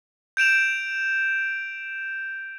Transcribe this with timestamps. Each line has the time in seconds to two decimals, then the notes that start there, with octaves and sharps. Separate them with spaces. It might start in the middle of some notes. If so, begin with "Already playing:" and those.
0.37 G6 D7 E7 F7